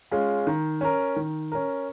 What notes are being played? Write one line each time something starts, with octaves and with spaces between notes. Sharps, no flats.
G#3 C#4 F4
D#3
C#4 A#4
D#3
C#4 A#4